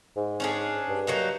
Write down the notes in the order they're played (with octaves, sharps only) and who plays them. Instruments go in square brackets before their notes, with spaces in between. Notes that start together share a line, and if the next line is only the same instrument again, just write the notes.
[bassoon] G#2
[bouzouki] C#4 D4 G#4
[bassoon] G2
[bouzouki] F#3 A#3 D#4